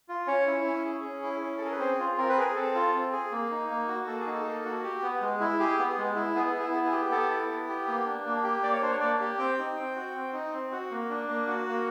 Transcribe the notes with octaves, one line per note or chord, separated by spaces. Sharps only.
F4
C#4 C#5
E4
C#4
G#4
C#4
E4
C#4
A4
G#4 A#4
B4
C4 C5
F4
C4 A#4
B4
G#4 A#4
C4 A4
F4
C4
G#4
A#3
D#4
A#3
F#4
A#3 A4
G#4
D#4
A4
A#3
F#4
G4
B3
G#3
E4
G4 G#4
B3
G#3
E4
B3 G#4
E4
G#4
B3
G#4
G4
B3 A4
E4
B3
G4
A#3
D4
A#3
G4
A#3 D5
C#5
D4 C5
C#5
A#3 D5
G4
C4 G5
D#4
C4
F#4
C4
D#4
C4
F#4
A#3
D4
A#3
F#4
A#3